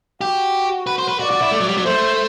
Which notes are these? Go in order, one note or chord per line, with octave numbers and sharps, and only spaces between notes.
F#4 G4
B4
C5
B4
F#4 D5
F#4
E4
A3
F#3
G3
F#3
A3 C5